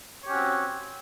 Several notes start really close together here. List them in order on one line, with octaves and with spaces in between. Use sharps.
C#5 G4 C#4 F#4 C4